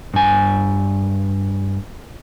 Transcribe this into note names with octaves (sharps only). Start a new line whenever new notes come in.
G2 G#5